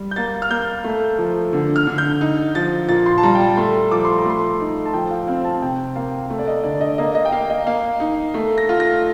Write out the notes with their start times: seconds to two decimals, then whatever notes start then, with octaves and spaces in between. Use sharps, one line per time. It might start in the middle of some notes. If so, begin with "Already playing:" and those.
Already playing: G3
0.11 G6
0.16 A#3 A6
0.42 F6
0.50 A#3 G6
0.84 A3
1.18 F3
1.53 D3
1.76 F6
1.87 D3
1.98 G6
2.21 D#4
2.55 F3 A6
2.89 A#2 A6
3.06 C6
3.18 A5
3.23 G3 A#5
3.35 G5
3.40 A5
3.57 A3 C6
3.92 F3 D6
4.05 C6
4.18 A#5
4.25 A3 C6
4.60 D#4
4.86 A5
4.94 F3 G5
5.11 F5
5.27 C4 F5
5.45 A5
5.62 C3 G5
5.96 A#3 F5
6.30 A3
6.39 D5
6.47 D#5
6.64 D3 D5
6.81 D#5
6.98 A#3 D#5
7.15 D#5
7.25 G5
7.32 A#3 F5
7.50 D#5
7.66 A#3 F5
8.00 D#4
8.34 A3
8.58 A#6
8.69 F4
8.80 A#6